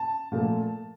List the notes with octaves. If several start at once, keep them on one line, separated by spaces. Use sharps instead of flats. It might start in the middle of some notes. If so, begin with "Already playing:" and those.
Already playing: A5
A#2 F3 A3